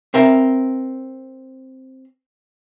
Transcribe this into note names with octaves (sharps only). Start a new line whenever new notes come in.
C4 A#4 E5